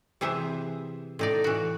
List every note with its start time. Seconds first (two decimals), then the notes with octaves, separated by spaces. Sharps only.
0.21 C3 E3 G#4 C5 E5
1.19 A2 D#4 D5
1.44 E3 F#4